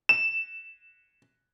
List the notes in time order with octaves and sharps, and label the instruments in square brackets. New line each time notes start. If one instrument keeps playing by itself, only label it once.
[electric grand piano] E7